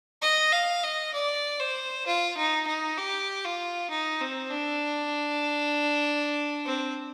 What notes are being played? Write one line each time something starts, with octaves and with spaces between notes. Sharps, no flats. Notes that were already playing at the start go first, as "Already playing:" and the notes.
D#5
F5
D#5
D5
C5
F4
D#4
D#4
G4
F4
D#4
C4
D4
C4